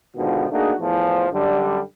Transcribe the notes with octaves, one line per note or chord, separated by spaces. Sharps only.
G#2 B2 D3 D#3 F3
A3 A#3 D4 D#4 F#4 G#4
E2 A2 E3 F3
F#2 D3 G3